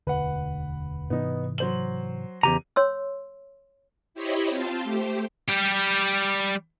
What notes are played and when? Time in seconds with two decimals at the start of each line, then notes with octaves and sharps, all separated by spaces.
0.07 E1 D2 D3 B4 F#5
1.10 G#2 C3 E3 B3 D#4
1.58 F#3 C5 F#7
2.43 E2 C#3 G4 A#5 D#7
2.76 C#5 C6 E6
4.14 E4 G4 C5 C#5 D#5 B5
4.50 C4 F4 A5 C6
4.84 A3 G4 C5
5.49 G3 G4